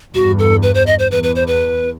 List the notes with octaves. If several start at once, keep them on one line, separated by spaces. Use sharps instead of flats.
E2 G2 F#4
A4
B4
C5
D#5
C5
E2 B4
B4
C5
B4